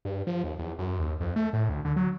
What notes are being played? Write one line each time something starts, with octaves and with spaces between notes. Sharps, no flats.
G2
F3
D#2
E2
F#2
D#2
F2
A3
A2
D2
D3
F#3